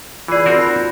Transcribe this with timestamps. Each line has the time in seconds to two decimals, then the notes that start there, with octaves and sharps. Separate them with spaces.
0.28 E3 F4 G#4 D5
0.46 C4 F#4 A#4
0.58 D#4 F4 B5